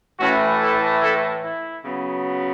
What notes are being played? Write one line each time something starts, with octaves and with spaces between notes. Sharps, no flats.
A2 E3 A3 C#4 F#4
E4 A4
E4 A4
E4
C#3 F#3 B3